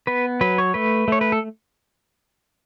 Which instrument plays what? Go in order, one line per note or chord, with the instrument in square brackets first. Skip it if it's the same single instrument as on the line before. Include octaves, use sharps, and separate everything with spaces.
[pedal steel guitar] B3 B4
F#3 B4
C#5
A3 B4
A3 C#5
B4
A4